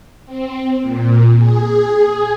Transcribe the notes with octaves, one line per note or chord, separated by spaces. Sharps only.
C4
A#2
G#4